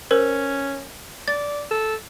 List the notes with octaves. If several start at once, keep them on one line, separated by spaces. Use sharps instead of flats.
C#4 A#4 C5
D5 A6
A4